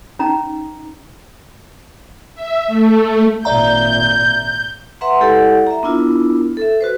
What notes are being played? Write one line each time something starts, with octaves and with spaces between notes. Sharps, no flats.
C#4 D#4 A#5
E5
A3
G#1 A#2 D5 E5 A#5 G6
B4 E5 F#5 A#5 C6
G#3 E4 G4 A4 D5 F#5
E5 A#5
B3 D4 E4 F4 A#4
A4 E5
F#4 B4 C5